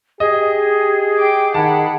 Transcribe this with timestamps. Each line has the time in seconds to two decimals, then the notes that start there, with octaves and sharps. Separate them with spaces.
0.20 G4 G#4 D#5
1.19 G5 D6
1.54 D#3 F#5 A5 B5